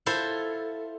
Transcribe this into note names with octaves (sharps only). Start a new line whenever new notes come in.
E4 F4 A4 C5